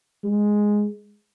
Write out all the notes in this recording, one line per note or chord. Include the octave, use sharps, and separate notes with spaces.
G#3